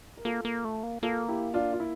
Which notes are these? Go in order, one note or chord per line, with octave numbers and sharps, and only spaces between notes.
A#4
A#3 F4 A4
A#3
A3
A#3
A#3 F4 A4
E4 G4
D4 F4
F4
E4